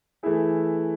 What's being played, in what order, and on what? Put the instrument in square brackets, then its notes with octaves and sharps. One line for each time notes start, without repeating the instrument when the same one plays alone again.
[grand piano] E3 A3 E4 G#4